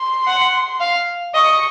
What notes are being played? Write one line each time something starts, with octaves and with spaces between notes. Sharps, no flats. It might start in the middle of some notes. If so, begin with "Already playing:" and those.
Already playing: C6
F#5
F5
D#5 C#6